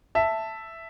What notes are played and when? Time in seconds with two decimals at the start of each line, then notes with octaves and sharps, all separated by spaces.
0.15 E5 A5